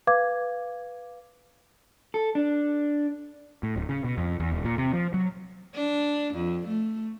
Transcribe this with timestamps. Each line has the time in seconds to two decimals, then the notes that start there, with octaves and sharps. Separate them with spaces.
0.07 B4 F5 D6 G#6
2.14 A4
2.35 D4
3.63 A2
3.76 D1
3.89 C#3
4.04 B2
4.18 F2
4.40 E2
4.52 D#1
4.65 A#2
4.78 C3
4.94 F3
5.14 F#3
5.75 D4
6.34 F2
6.67 A3